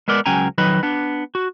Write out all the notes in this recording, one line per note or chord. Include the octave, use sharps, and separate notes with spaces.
G#3 B3 A#4 D5
C#2 F#3 C#4 G5 G#5 A#5
F2 D#3 F#3 B4 D#5 B5
B3 D4
F#4